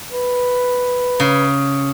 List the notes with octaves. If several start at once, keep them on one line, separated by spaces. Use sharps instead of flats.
B4
C#3